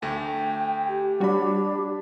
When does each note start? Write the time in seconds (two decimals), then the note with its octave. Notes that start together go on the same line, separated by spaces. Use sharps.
0.02 D2 A3 G5
0.88 G4
1.20 G3 D4 F#4 C#5 B5